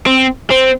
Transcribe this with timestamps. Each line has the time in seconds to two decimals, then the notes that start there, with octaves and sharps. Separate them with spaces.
0.06 C4
0.50 C4